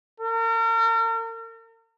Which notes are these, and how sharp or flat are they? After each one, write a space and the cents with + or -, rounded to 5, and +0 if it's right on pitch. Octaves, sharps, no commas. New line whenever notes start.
A#4 -40